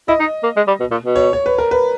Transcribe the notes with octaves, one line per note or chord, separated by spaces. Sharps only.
E4 D#5
D#4
A#3
G#3
G3
B2
A#2
B2
C#5
C#5
B4
A#4
B4